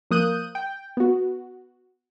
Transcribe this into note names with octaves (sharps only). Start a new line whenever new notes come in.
F3 A#3 D#6 F#6 G6 D#7
G5
B3 F#4